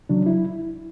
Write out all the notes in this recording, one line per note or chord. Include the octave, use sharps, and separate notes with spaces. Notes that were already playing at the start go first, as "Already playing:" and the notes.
C#3 F#3 D4
E4